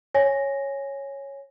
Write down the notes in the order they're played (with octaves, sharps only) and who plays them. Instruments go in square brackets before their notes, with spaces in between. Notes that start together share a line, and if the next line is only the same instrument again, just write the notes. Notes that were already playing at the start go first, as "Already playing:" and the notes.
[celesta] C#5 G#5 A#6